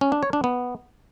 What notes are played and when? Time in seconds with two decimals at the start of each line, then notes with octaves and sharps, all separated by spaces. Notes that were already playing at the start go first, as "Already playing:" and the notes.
0.01 C#4
0.12 D4
0.23 C#5
0.33 D4
0.44 B3